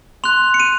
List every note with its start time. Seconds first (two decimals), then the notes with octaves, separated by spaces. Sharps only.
0.24 C6 F#6 F7
0.54 C#7
0.60 D#7